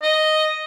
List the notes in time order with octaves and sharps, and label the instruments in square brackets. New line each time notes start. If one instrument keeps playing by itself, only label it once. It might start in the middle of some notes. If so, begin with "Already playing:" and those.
[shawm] D#5